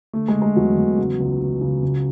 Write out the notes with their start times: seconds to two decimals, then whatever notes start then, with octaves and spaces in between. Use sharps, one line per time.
0.13 D3 A3
0.28 G#3
0.35 D3
0.42 G#3
0.56 E2 F#3
0.77 E2
0.99 C#3
1.20 C#2
1.41 C#3
1.61 C#3
1.83 C#2